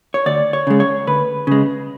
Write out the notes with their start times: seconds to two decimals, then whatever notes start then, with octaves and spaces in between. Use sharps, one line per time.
0.14 C#5
0.26 D2 D5
0.53 C#5
0.67 C#3 G#3
0.80 C#5
1.07 D2 B4
1.47 C#3 G#3